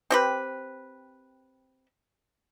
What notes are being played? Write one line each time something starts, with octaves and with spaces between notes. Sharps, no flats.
C4 G4 B4